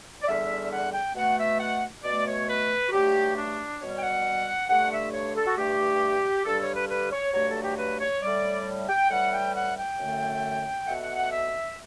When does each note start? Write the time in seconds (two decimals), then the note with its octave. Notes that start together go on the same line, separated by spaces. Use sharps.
0.22 D5
0.27 E2 D3 G3 E5
0.71 F#5
0.92 G5
1.14 B2 A3 F#5
1.37 E5
1.59 F#5
2.03 B2 A3 D5
2.26 C#5
2.48 B4
2.87 F#4
2.92 G2 F#3 A3 G4
3.36 D4
3.79 B2 G3 C#5
3.96 G5
4.02 F#5
4.68 G2 D3 A3 F#5
4.91 E5
5.12 C#5
5.35 A4
5.45 F#4
5.56 G2 E3 A3 G4
6.45 G2 D3 G3 A4
6.60 C#5
6.74 B4
6.88 B4
7.11 C#5
7.33 G2 F#3 A3 C#5
7.48 A4
7.62 G4
7.77 B4
7.99 C#5
8.21 A2 G3 D5
8.88 G5
9.09 A2 E3 G3 F#5
9.32 G5
9.54 F#5
9.76 G5
9.98 F#2 D3 A3
10.86 B2 A3 F#5
11.01 F#5
11.16 F#5
11.31 E5